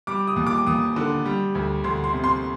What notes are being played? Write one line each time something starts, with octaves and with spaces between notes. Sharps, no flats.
G3 D6
D#6
D#2
D6
D#2 D#6
D3
G3
D2
D2 C6
C6
C3
C6